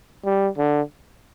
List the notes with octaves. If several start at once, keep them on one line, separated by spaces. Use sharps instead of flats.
G3
D3